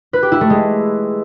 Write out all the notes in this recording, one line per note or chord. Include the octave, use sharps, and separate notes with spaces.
B4
G4
E4
A3
G#3